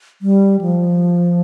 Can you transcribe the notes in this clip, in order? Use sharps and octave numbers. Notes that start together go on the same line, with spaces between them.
G3
F3